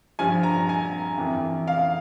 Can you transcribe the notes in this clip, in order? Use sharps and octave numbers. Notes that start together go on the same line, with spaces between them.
G2 F3 G#5
A#5
G#5
F2 E3
F5